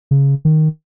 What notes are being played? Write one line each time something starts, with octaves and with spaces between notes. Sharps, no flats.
C#3
D#3